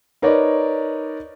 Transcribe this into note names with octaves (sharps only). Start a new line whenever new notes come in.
D#4 A#4 B4 C#5 D5